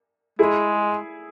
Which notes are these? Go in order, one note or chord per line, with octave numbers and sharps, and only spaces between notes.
G#3 E4 G#4